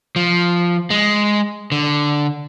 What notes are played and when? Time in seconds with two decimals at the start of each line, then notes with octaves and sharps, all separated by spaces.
0.16 F3
0.90 G#3
1.72 D3